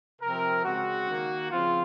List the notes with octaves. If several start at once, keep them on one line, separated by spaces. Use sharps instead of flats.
C3 F3 C4 A#4
C#3 G#3 C4 F#4
D#3 A#3
C#3 F3 C4 F4